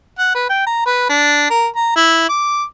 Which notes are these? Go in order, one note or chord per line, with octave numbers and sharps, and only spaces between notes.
F#5
B4
G5
A#5
B4
D4
A#4
A#5
E4
D6